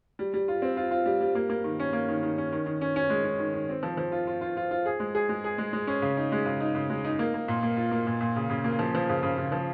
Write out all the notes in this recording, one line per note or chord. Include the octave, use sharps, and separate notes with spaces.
G3
G3
F4
C4
F4
F4
G3
G3
A#3
A#3
D#3
C#4
A#3
D#3
D#3
C#4
D#3
D#3
C#4
C#4
G#3
C#4
D#3
D#3
C4
F3
F3
F4
F4
F4
F4
F4
G#4
G#3
G#4
G#3
G#4
G#3
G#3
C#4
C#3
D#4
G#3
C#3
D#4
C#3
G#3
D#4
A#3
A#3
A#2
A#3
F4
A#3
A#2
A#2
C#3
C#3
A#3
F3
F3
C#3
C#3
C#3
F3